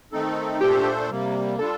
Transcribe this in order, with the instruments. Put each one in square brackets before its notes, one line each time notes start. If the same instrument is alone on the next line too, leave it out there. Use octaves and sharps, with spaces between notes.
[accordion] D#3 A3 C4 D#4 A4
[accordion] A#2 A3 D4 A4 C5 [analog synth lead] G4
[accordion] C3 G3 A#3
[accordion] G3 D4 F4 [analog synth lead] A4